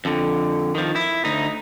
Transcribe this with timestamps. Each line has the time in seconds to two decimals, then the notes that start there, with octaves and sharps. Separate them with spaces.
0.05 F2 D3
0.75 D#3 F3
0.95 E4
1.25 D2 D#4